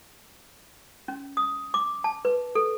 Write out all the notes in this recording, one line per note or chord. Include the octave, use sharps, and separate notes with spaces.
C#4
D#6
D6
A5
B4
A4